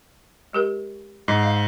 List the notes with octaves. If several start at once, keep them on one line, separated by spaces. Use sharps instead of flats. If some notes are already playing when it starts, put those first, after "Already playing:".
G#3 G4 A#4
G#2 D#5
D#5 F5